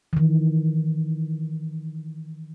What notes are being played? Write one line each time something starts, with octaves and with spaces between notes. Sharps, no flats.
D#3 E3